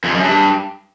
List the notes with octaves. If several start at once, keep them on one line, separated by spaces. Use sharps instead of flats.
F2
F#2
G2